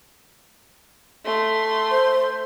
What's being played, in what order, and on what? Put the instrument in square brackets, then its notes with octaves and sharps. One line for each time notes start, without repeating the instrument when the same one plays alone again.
[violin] A3 C6
[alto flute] C5